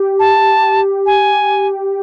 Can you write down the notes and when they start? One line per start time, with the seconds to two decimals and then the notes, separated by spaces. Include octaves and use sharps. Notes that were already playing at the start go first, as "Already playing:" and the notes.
Already playing: G4
0.19 A5
1.06 G#5